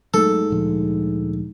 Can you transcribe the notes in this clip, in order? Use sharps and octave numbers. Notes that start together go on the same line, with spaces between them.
G#2 F#3 A3 A#3 A4
D2 A#2 F3